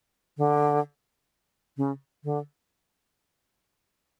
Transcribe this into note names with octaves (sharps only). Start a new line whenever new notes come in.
D3
C#3
D3